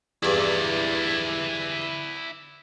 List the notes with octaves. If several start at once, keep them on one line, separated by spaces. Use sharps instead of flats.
E2 G2 E4 D5